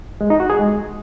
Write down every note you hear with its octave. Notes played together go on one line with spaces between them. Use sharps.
G#3
D#4
F#4
G#4
G#3